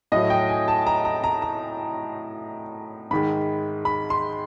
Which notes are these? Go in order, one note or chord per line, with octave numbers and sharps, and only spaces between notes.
A2 F#3 A3 D#5
G5
G#5
A5
A#5
A#5
A#5
A#5
G#2 D#3 G#3 B5
B5
C6